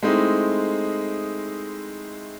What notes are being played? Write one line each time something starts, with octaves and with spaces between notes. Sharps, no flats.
G#3 A3 C4 D#4 E4